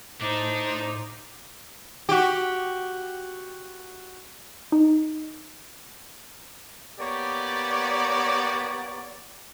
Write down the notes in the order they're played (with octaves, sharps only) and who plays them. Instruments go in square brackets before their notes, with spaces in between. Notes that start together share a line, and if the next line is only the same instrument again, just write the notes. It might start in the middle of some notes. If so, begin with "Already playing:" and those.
[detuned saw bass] A2 [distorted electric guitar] D4 [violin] D#4 [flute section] C5 D6
[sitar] F#4 G4
[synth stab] D#4
[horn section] A#3 B3 G4 C#5 D5